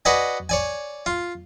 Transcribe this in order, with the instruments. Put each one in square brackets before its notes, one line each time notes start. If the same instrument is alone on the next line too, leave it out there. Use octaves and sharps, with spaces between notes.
[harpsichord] F#4 B4 D5 D#5 G#5
C#5 D5 G#5
F4